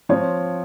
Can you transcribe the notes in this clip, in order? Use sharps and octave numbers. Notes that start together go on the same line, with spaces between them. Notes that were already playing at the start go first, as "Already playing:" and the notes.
F3 C4 C#5